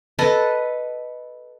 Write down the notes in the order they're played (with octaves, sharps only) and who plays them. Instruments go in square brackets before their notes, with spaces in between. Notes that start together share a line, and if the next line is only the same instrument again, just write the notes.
[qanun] A4 B4 D#5 A5